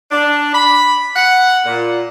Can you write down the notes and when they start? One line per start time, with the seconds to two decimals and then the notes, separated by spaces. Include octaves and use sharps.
0.11 D4
0.53 B5
1.16 F#5
1.65 A#2